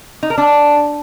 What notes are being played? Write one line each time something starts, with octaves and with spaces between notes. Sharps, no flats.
D#4
A#4
D4